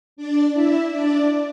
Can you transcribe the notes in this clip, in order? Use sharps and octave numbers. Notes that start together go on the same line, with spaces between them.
D4 D5
E4 E5
D4 D5